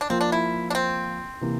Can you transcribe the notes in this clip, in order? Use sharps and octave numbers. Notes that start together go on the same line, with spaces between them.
D4
F3 A#3 C4 F4
D4
E4
D4
C4
C3 E3 A#3